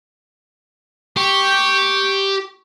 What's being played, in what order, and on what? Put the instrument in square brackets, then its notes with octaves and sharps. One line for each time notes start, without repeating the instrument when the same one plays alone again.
[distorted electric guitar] G4 [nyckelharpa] C#6